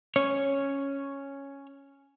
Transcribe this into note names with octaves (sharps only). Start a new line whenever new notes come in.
C#4 C#5